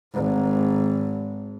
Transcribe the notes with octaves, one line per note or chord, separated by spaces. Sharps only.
G#1